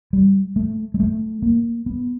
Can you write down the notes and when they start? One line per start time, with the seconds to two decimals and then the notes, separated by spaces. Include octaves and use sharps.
0.13 G3
0.56 A3
0.94 G#3
1.00 A3
1.42 A#3
1.86 B3